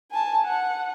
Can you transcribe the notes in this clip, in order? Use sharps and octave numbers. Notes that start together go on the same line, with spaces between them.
G#5 A5
F#5